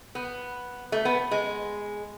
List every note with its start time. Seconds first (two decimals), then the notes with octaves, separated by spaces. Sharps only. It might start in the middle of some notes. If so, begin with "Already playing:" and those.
0.15 B3
0.92 A3
1.05 B3
1.31 G#3